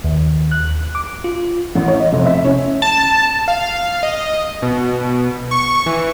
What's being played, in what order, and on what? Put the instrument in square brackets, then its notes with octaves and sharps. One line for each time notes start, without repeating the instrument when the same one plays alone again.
[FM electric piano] D#2
F#6
D6
F4
[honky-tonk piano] A1
C#5
D#5
F1
E5
C#4
[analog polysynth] A5
F5
D#5
B2
C#6
E3